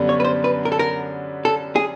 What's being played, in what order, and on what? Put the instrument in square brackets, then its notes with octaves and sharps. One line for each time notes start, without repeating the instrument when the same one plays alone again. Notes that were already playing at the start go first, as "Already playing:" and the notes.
Already playing: [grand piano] F#2 D3 G3 B3 D4
[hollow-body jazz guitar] C#5
B4
C5
B4
A#4
A4
A#4
A4
G#4